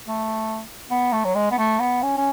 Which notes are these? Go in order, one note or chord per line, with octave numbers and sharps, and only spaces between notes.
A3
B3
A3
F#3
G#3
B3
A3
B3
C#4
C#4